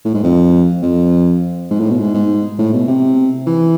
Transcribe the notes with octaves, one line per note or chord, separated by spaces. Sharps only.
A2
G#2
F2
F2
G#2
A2
B2
G#2
G#2
A2
B2
C3
E3